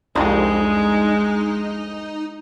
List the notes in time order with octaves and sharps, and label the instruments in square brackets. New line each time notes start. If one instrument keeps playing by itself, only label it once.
[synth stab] C2 F2 [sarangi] G#3 [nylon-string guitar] D4 [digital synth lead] D#4